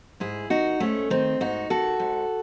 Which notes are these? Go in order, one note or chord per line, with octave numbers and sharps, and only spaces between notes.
G#2 E4 G#4
D#3 D#4 F#4
G#2 A3 C#4
D#3 C4 D#4
G#2 D#4 F#4
D#3 F#4 A4
G#2